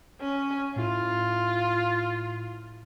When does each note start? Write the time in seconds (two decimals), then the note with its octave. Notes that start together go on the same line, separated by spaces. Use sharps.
0.21 C#4
0.76 A2 E4 F4